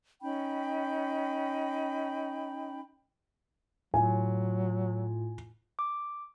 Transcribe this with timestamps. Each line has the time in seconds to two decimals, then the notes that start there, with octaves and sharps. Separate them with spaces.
0.22 C#4 D#4 G5 B5
3.94 A2 F#3 F4 G#5
5.79 D6